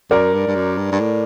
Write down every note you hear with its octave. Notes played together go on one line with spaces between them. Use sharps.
F#2 A#4 D5
G2
G2
F#2
G2
G2
A2